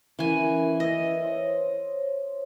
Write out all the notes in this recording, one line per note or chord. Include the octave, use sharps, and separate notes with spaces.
E3 C#4 A#4 G#5
E4 B4 D#5 E5
C5 C#5 C6